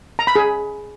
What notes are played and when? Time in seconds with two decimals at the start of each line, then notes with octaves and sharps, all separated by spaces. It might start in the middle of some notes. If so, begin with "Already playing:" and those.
0.19 A#5
0.27 B5
0.36 G#4